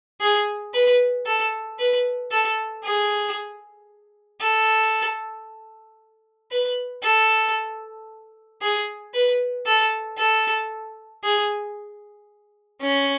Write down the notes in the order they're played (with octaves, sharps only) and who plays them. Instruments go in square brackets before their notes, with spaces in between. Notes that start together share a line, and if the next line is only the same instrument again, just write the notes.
[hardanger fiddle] G#4
B4
A4
B4
A4
G#4
A4
B4
A4
G#4
B4
A4
A4
G#4
C#4